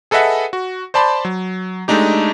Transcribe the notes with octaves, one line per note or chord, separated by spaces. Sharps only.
G#4 A4 B4 D#5 E5 F#5
F#4
C5 D5 A5 B5 C6
F#3
G#3 A3 D4 D#4 G4